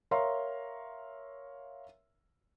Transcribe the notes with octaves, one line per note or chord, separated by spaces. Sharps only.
A#4 C#5 E5 F5 A#5 C6